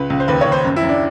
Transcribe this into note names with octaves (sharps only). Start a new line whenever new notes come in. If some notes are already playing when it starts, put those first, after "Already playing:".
Already playing: C#2 B4
C#2
C5
D#2 B4
D#2 C#5
C5
F#2
E4
F#2
D4